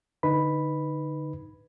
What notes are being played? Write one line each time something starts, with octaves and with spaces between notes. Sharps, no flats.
D3 D#4 B4 B5